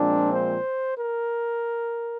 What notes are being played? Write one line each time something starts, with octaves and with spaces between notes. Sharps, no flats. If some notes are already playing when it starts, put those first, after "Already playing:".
Already playing: A#2 F3 G#3 C4 D4
C5
A#4